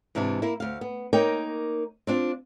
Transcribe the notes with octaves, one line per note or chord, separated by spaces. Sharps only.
G#2 C3 E3 D4 E4
A#3 E4
D2 F5
B3
A#3 D#4 A#4 C#5 G5
C4 D4 F4